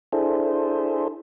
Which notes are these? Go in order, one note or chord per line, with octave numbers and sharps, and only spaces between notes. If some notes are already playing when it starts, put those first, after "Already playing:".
D4 E4 G#4 A4 C5